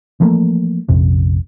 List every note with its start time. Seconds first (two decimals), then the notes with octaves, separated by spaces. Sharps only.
0.20 E3 F3 A3 A#3
0.89 A#1 F2 C3